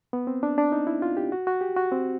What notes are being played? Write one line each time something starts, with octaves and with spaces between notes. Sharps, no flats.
B3
C4
D4
D4
D#4
E4
F4
G4
F#4
F#4
G4
F#4
C4